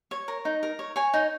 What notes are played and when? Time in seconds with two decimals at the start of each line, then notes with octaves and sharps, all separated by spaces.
0.11 C#5
0.28 A#4
0.45 D#4
0.63 A#4
0.79 C#5
0.96 C#5 G#5
1.14 D#4